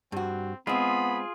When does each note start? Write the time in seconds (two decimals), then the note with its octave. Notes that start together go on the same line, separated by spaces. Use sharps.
0.12 G2 C4 F#4
0.67 G#3 B3 C4 F4 G#4 B5